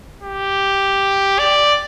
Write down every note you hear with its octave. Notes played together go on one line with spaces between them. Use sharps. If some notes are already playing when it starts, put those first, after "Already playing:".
G4
D5